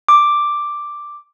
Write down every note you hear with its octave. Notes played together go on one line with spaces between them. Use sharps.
D6